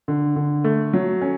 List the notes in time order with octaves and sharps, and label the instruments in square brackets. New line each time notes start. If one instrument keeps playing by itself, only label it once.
[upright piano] D3
D3
A3
F#3
C#4